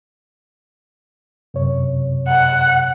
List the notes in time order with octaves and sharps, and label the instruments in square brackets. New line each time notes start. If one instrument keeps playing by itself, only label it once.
[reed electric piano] F#2 C3 C#5
[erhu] F#5